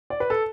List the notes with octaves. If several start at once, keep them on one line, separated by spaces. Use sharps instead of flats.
D5
B4
A4